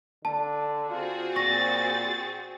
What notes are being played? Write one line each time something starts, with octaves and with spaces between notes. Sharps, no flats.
D3 A5
C4 F4 F#4 G#4
A#2 C#6 A6 A#6